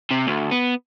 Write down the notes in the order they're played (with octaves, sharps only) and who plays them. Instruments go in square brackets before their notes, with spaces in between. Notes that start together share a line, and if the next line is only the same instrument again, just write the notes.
[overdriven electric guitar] C3
D2
B3